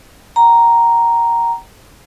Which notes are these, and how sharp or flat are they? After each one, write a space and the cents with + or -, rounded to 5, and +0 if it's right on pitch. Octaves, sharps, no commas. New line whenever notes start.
G5 -40 A#5 +0